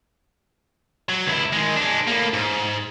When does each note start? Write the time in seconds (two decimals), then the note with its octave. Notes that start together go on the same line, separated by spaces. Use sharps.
1.09 F#3
1.27 C#2 E4
1.53 D#3 G#3
1.76 G#3 D4
2.07 A2 A#3
2.34 G#2